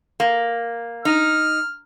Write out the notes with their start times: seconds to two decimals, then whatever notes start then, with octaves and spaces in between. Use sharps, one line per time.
0.20 A#3
1.05 D#4 F6